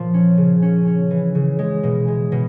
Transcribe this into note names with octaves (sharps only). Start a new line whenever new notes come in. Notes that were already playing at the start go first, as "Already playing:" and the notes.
Already playing: A#2 F3
C#4
C#3
C#4
C#4
E3
C#3
G#3
B2
G#3
B2